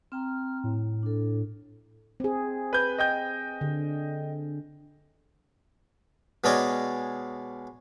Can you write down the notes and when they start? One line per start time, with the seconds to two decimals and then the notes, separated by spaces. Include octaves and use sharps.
0.12 C4 G5 A#5 F6
0.64 A2
1.03 D4 A4
2.20 C4 G#4
2.73 B4 G6
2.98 D#5 G5 G6
3.61 D3
6.44 B2 G#3 C#4 D5 D#5 D6